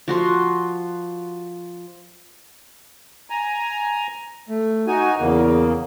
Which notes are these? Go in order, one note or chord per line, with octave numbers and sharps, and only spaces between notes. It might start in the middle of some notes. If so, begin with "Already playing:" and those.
F3 F#4 C6
G#5 A#5
A3
D#4 F#4 G#5
E2 C#3 A#3